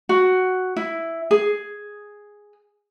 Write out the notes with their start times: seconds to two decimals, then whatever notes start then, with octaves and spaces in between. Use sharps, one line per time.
0.09 F#4
0.76 E4
1.31 G#4